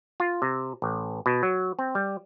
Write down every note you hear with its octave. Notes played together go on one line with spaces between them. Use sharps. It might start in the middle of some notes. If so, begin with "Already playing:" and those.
F4
C3
A1
B2
F#3
C4
G3